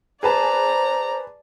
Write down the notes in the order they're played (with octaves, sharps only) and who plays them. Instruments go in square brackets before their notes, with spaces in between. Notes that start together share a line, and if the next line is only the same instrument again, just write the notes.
[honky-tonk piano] G#4 B4 A5 [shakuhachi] C5 [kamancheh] D5 A#5